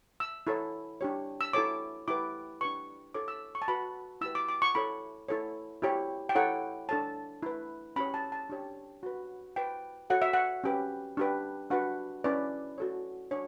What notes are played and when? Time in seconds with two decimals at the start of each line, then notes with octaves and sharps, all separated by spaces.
0.20 E6
0.47 E4 A4 C#5
1.01 D4 G4 C#5
1.41 E6
1.53 E4 A4 C#5 D6
2.08 E4 G4 B4 D6
2.61 D4 G4 B4 C#6
3.14 E4 A4 C#5 D6
3.28 E6
3.55 C#6
3.62 A5
3.68 F#4 B4 B5
4.21 E4 G4 B4 E6
4.35 D6
4.49 D6
4.62 C#6
4.75 E4 A4 C#5 B5
5.29 E4 A4 C#5
5.82 E4 G4 C#5
6.29 G5
6.35 E4 A4 C#5 F#5
6.89 D4 A4 C#5 A5
7.43 E4 B4
7.96 C#4 G4 C#5 B5
8.14 A5
8.32 A5
8.50 D4 G4 C#5
9.03 F#4 B4
9.56 E4 B4 G5
10.10 F#4 A4 C#5 F#5
10.22 E5
10.34 F#5
10.64 C#4 G4 B4
11.17 D4 G4 B4
11.70 D4 F#4 B4 F#5
12.24 C#4 E4 B4 D5
12.78 F#4 A4 C#5
13.31 D4 C#5